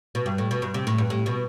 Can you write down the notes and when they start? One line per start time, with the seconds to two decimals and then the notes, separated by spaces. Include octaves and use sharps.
0.15 B2
0.26 G2
0.38 A2
0.51 B2
0.62 G2
0.74 C3
0.87 A2
0.98 G2
1.10 A2
1.26 B2